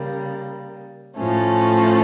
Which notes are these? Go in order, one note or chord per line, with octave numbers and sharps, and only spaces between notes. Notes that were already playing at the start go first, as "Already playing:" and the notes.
Already playing: C#3 G3 A#3
A2 F3 A3 C#4